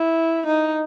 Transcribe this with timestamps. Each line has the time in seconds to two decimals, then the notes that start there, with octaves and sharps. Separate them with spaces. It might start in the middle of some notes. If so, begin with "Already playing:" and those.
Already playing: E4
0.47 D#4